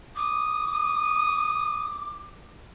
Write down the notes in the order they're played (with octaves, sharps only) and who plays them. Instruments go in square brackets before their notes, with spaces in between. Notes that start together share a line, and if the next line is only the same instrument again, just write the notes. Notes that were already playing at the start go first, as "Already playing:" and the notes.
[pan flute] D6 [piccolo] D#6